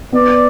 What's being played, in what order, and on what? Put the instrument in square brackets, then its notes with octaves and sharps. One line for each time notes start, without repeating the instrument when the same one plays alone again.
[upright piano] B3 [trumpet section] D5